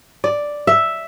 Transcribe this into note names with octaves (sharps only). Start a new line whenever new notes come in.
D5
E5